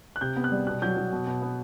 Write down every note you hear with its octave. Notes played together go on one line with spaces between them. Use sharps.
F#6
C3 G6
B3
F#6
G3
B2 F#6
F#3 G6
F#3
B2
B2
B3